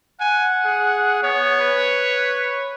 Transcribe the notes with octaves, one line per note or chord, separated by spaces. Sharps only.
F#5 G#5
G#4
B3 C#5
B4